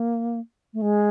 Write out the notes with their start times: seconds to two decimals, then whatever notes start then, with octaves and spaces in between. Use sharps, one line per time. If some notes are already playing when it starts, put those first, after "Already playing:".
Already playing: A#3
0.74 A3
0.82 G#3